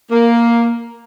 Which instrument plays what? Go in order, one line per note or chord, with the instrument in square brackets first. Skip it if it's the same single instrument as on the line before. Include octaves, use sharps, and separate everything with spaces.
[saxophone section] A#3